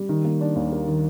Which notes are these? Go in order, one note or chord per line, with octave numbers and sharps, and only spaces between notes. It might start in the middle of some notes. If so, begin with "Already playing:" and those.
Already playing: G3
D#3
A#3
D4
D#2
A#3
D#3